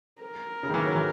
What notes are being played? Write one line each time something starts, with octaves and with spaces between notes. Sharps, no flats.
A#4
C#3
D#3
E3
F#3
E3